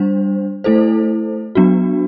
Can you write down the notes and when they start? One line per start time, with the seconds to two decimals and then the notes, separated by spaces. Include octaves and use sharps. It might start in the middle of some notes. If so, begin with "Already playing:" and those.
Already playing: G3 D4 C5
0.64 A3 E4 A4 C5
1.55 F#3 B3 D4 F#4